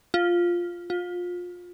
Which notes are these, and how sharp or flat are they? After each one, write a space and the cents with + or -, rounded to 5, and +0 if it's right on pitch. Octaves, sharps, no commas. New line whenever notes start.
F4 +0
F4 +25